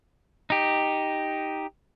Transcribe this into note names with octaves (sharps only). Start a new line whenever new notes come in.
D#4 G4